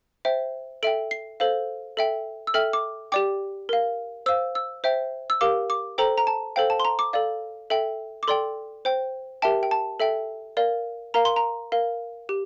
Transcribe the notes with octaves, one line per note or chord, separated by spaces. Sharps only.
C5 E5 G5
A4 E5 G5 D7
C7
A4 C5 F5
A4 E5 G5
E6
A4 E5 G5 F6
D6
G4 D5 G5 D6
A#4 F5
C5 F5 E6
E6
C5 E5 G5
E6
G4 A#4 F5 D6
D6
A4 C5 G5 A#5
A#5
A5
A4 C5 F5 G5
A5
C6
A#5
D6
A4 D5 F5
A4 E5 G5
D6
A4 D5 G5 C6
C5 G5
G4 A#4 E5 G5 A5
G5
A5
A4 E5 G5
A#4 D5 F5
A#4 F5 A#5
C6
A#5
A#4 F5
G4